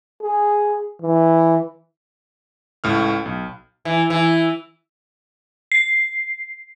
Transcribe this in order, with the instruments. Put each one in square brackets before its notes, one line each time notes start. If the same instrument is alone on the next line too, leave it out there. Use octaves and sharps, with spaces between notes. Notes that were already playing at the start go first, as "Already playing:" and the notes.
[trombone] G#4
E3
[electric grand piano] C#2 A2 A3 F6
B1
[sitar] E3
E3
[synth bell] C7